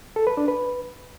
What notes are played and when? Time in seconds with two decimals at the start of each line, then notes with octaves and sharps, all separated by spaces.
0.16 A4
0.27 B4
0.37 D4
0.48 B4